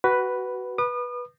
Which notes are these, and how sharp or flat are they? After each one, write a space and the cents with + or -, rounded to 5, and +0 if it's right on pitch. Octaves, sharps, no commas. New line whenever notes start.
F#4 +20 B4 +0
B4 -15 D#6 -40